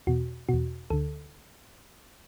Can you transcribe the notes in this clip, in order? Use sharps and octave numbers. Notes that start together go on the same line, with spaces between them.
E2 B2 F#4
E2 B2 F#4
D2 D3 A4